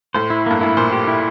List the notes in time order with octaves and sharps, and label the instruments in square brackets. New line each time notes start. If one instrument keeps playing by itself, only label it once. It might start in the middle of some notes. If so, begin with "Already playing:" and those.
[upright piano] A2 [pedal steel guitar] C5
[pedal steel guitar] E4
[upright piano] G2 [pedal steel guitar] A#3
[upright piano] A2 [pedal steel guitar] E4
[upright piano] A#2 [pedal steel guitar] C5
[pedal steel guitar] G4
E4